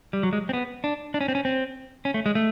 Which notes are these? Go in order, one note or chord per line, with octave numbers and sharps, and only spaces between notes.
G3
F#3
G#3
C4
B3
D4
D4
C#4
C4
C#4
C4
C#4
A3
G#3
A3